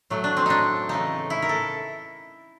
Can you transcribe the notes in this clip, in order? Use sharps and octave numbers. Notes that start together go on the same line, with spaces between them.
A2 F#3 A3
D4
C4
D4 D#4
C#3 E3 A3 D#4
E4
A#4
A4